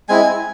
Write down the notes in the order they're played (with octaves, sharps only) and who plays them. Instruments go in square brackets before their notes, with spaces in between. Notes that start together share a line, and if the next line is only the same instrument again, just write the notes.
[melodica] G#3 C4 E4 G#5